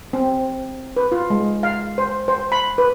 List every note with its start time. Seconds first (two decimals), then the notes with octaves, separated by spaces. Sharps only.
0.13 C4
0.97 B4
1.12 F4
1.30 G#3
1.63 F5
1.98 C5
2.28 C5
2.52 B5
2.78 B4